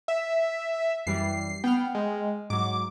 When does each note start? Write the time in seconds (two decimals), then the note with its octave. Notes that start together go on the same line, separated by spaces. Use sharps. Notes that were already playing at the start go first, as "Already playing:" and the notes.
0.08 E5
1.07 F#2 E3 G3 C7
1.64 B3 G5 F6
1.94 G#3
2.50 G#2 F#3 D6